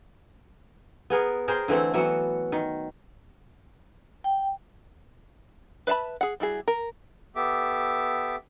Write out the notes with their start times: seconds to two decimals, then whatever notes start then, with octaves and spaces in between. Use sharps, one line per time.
1.10 B3 G#4 A#4
1.48 G#4 A#4 C5 G5
1.68 D3 E3 A3 C4
1.94 E3 F#3 B3 F#4
2.52 D#3
4.24 G5
5.87 B4 E5 F5 A5 B5
6.21 G#4 F#5
6.40 G3 E4 F#4 G#4
6.68 A#4
7.36 B3 G4 A4 E5 D6